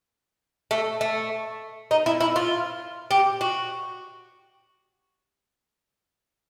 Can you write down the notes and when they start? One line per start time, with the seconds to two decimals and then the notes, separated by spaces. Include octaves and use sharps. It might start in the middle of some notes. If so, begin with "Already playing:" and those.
0.71 A3
1.01 A3
1.91 D#4
2.06 E4
2.21 E4
2.36 F4
3.11 G4
3.41 F#4